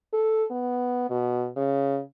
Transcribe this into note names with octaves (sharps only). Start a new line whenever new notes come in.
A4
B3
B2
C#3